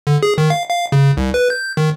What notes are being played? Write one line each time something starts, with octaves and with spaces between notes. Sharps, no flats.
D3
G#4
D#3
F5
F5
C#3
C2
B4
G6
D#3